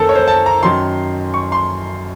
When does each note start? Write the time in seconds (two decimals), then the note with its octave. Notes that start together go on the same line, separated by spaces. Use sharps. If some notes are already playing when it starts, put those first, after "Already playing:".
Already playing: F#2 D#3 A#3 A4 A#4 C5
0.09 C#5
0.15 C5
0.28 A5
0.46 A#5
0.63 F#2 D#3 F#3 C6
1.34 C#6
1.52 C6